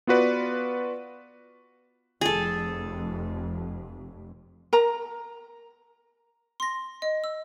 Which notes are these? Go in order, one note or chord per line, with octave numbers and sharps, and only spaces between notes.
B3 F4 F#4 B4 D5
F1 F2 G#4 A4
A#4 A#5
C6 A#6
D#5
E6